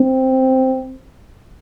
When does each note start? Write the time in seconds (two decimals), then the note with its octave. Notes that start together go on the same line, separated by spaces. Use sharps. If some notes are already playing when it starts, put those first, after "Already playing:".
Already playing: C4